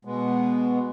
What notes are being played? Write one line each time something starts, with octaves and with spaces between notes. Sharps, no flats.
B2 G#3 B3